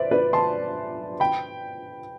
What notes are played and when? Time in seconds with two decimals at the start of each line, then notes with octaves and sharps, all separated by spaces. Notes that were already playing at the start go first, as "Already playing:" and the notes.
Already playing: B4 C5 D5 E5
0.11 B4 D5
0.33 A5 C6
1.20 G5 B5